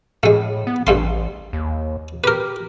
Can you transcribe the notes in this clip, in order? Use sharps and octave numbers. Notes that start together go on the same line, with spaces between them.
A2 G#3 A3
B3
A1 G2 A3 C6
D#2
G4 A#4 B4